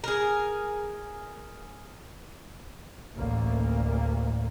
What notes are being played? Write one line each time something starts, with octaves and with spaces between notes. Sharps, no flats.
G#4 A#4
A1 D2 A2 A#3